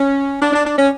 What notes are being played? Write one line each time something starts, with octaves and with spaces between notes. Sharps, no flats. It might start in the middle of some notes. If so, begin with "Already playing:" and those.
Already playing: C#4
D4
D4
D4
C#4